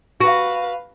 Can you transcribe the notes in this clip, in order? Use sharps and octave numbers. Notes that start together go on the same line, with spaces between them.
F#4 B4 F5